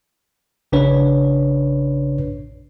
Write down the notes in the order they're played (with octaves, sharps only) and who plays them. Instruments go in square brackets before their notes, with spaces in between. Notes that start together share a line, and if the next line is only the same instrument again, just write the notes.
[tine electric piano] A#1 C#3 D4 B4 C#5